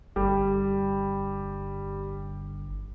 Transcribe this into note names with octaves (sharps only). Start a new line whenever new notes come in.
G1 G3